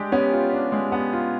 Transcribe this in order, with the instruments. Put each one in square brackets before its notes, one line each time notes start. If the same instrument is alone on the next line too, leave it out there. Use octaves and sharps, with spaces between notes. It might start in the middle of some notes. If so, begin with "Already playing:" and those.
Already playing: [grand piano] G#3 D4 [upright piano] G4
[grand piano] B3 [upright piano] C#4
[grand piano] F4
D4
G#3
B3
F4